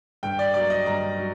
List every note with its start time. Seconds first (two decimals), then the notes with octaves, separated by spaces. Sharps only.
0.23 G2 G5
0.39 D5
0.54 F#3 A#3 D5
0.70 D#5
0.86 G2 A#5
1.17 F#3